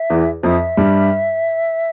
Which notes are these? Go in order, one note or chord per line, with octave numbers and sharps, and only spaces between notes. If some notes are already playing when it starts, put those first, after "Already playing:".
Already playing: E5
E2 E3
F2 F3 E5
G2 G3